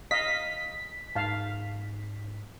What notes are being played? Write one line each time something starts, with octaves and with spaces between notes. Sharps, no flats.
D#5 F5 B6
G#2 F5 A5